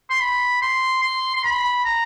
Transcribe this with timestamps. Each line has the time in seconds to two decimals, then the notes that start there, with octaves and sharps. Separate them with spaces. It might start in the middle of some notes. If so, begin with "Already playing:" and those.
0.10 C6
0.21 B5
0.62 C6
1.03 C6
1.36 C6
1.44 B5
1.85 A#5